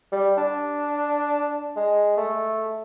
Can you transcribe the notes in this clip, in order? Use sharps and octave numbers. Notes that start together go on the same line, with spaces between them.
G3
D4
G#3
A3